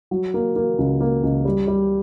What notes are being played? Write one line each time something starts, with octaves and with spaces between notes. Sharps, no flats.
F#3
A#3
A#3
C#2
A#3
C#2
G3
G3